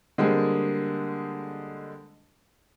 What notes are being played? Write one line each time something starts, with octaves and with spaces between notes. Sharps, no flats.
D3 G3 G#3 A#3 C4 G#4